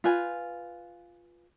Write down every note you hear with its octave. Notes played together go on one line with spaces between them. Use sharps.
F4 B4 G#5